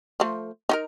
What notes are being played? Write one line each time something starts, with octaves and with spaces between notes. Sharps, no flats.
F3 A3
D#4 F#4 A#4